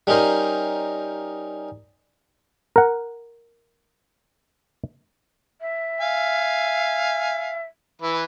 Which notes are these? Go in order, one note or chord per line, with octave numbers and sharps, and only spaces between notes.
G3 C#4 D#4 A#4 C5
A#4 F#5
E5
F5 G#5
E3 E4 B4